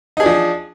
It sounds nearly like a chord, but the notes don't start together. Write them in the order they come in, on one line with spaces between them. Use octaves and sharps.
D#4 G#4 D4 F3